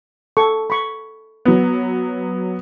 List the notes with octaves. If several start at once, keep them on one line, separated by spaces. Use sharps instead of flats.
A4 C#6
B5 C#6
F#3 B3